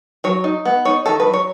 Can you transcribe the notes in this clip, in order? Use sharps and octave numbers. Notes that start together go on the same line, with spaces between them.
F#3 C#5
D#4
B3
D#4 C#5
D#3 A4
B4
F#3
C#5